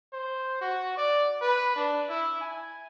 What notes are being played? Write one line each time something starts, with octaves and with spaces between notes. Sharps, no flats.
C5
F#4
D5
B4
D4
E4
G#5